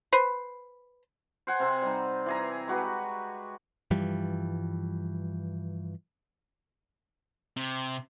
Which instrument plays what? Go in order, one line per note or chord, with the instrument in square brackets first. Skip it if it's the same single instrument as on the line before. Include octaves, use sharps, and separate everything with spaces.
[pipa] B4 C5
[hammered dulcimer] C5 F#5 G#5
C3 C4 C6
G3 D#4
E3 G#4 A#5
G#3 F#4 G4 B4
[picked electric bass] G2 E3 F3 G3
[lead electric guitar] C3